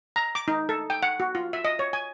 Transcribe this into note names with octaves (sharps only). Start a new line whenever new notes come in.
A#5
D6
D#4
A4
G5
F#5
F#4
F4
E5
D#5
C#5
G#5